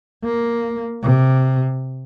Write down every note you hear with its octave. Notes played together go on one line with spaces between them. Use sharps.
A#3
C3